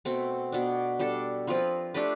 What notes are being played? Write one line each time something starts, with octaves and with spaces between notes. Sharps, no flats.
B2 A3 C4
B2 B3 D4
G3 D4 A4
F3 C4 F4 B4
A3 D4 G4 B4